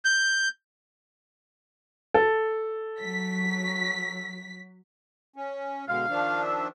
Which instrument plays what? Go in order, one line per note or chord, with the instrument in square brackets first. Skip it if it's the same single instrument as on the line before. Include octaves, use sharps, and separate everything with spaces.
[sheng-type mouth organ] G6
[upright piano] A4
[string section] F#3 B6
[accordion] C#4
[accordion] B2 D3 G#3 [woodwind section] F5
[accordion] D#3 F3 D4
[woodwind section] E5